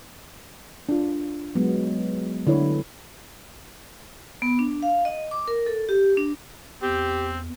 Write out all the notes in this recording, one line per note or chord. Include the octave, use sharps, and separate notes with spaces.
D4 F4
F#3 G#3 B3
D3 E4 C#5
B3
D4
F5
D#5
D6
A#4
A4
G4
D4
E2 C4 G4